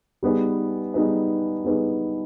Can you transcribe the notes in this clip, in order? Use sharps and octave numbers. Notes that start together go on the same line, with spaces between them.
G3 B3 D#4 G#4 B4
G3 B3 D#4 G#4 B4
G3 B3 D#4 G#4 B4